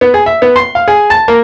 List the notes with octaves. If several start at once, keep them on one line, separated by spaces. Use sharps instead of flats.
B3
G#4
E5
B3
C6
F5
G#4
A5
A#3